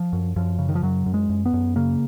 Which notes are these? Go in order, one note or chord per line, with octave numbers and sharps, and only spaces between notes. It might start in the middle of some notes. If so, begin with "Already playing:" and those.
Already playing: F3
F#2
F#2 F3
C#3
D#3
F3
F#2 F#3
F#2
G#3
F#2
B3
F#2
C#3 A#3